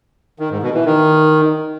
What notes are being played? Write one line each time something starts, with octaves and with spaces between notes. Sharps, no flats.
D#3
G#2
B2
E3
D#3